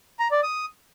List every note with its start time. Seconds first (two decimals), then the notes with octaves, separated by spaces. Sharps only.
0.19 A#5
0.31 D5
0.43 D#6